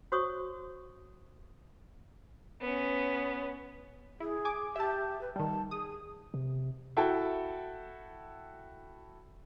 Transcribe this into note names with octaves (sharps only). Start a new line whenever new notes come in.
F#4 C5 C#5 C#6 D#6
B3 C#4
E4 G#4
G#5 D6
G4 E5 A5
B4
D#3 G3 A5
G#4 D#6
C3
E4 F#4 A4 G5 A5